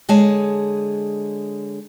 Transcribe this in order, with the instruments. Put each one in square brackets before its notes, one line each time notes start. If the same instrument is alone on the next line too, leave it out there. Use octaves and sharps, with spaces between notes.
[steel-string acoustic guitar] D3 G#3 G#4 C#5 A5